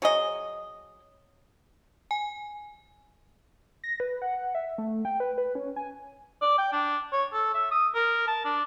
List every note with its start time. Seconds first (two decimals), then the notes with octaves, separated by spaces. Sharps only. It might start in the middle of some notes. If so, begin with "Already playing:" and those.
0.02 F#3 G#4 D#5
2.11 G#5
3.84 A#6
4.00 B4
4.22 F#5
4.55 E5
4.78 A3
5.05 G5
5.20 B4
5.38 B4
5.55 C#4
5.76 G#5
6.42 D5
6.58 G5
6.72 D4
7.13 C#5
7.33 A4
7.54 E5
7.71 D#6
7.95 A#4
8.27 A5
8.45 D4